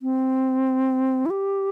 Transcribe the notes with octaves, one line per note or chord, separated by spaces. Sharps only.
C4
E4
G4